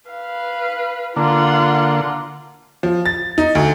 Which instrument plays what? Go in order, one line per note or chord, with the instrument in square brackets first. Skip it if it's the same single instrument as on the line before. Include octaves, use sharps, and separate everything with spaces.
[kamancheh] B4 F5
[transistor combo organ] D3 A#3 [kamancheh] F4 F#5
[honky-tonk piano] F3
A6
D#4
D2